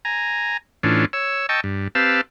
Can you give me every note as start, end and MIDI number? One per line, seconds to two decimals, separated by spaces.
0.05 0.57 80
0.05 0.57 82
0.83 1.05 45
0.83 1.05 52
0.83 1.05 61
0.83 1.05 62
0.83 1.05 65
1.13 1.46 73
1.13 1.46 88
1.49 1.61 75
1.49 1.61 79
1.49 1.61 81
1.49 1.61 85
1.49 1.61 88
1.64 1.88 43
1.95 2.21 60
1.95 2.21 67
1.95 2.21 71
1.95 2.21 77
1.95 2.21 81
1.95 2.21 88